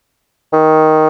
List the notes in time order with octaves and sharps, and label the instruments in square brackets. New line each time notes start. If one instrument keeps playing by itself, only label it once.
[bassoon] D#3